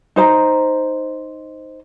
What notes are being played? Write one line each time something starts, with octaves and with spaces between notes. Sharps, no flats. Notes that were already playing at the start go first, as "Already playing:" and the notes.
D#4 C5 A#5